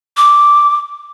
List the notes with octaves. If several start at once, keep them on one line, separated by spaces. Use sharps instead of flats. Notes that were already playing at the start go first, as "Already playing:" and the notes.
D6